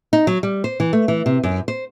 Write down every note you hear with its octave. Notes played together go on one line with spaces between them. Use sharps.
D#4
F#3
G3
C5
E3
A3
E3
C3
F#2
C5